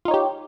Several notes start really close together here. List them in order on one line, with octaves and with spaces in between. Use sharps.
F4 D#4 C#5 G4